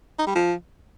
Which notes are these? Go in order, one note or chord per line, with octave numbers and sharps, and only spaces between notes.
D#4
G3
F3